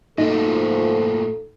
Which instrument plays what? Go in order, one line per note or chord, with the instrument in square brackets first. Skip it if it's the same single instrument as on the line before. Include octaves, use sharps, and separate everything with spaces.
[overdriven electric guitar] A#2 A3 [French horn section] F3 F#4 [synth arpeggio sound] D#4 [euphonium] A4